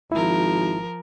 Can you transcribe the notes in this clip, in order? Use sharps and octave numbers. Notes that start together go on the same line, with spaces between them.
G#1 F3 E4 A#4